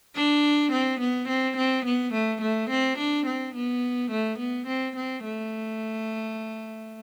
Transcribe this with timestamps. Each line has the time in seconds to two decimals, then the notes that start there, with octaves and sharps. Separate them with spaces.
0.15 D4
0.72 C4
1.00 B3
1.28 C4
1.57 C4
1.85 B3
2.13 A3
2.41 A3
2.70 C4
2.98 D4
3.26 C4
3.55 B3
4.11 A3
4.39 B3
4.67 C4
4.96 C4
5.24 A3